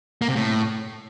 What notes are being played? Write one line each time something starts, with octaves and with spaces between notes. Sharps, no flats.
A#3
C3
A2